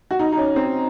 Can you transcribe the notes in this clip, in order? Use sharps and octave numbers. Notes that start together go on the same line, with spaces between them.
F#4
D#4
D#4
C#4
C4